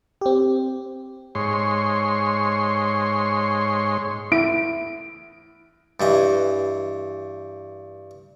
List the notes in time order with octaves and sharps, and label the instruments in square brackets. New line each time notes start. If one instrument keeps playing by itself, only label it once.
[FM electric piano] C4 G4
[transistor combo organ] G#2 C#5 C6
[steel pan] E4 [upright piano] D7
[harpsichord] G2 E3 D#5